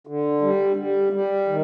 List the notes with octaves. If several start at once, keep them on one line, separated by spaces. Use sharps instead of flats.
D3
G3
G3
G3
D#3